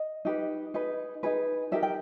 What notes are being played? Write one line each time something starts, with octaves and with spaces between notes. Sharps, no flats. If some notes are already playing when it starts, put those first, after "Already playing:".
Already playing: D#5
D#4 G4 B4
D#4 G#4 B4
D#4 G#4 B4
D#4 G4 A#4 E5
G5